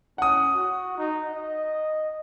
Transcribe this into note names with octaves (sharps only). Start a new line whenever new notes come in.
C#4 F#5 D#6
F#4
D#4
D#5